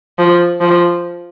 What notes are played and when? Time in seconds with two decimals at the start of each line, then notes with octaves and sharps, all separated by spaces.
0.19 F3
0.61 F3